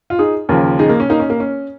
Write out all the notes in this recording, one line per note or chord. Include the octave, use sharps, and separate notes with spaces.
F4
D#4 G#4
D#2 C#3 F3 F4 A#4
D#4 G#4
A#3
C#4
A#3 D#4
C#4
A#3
C#4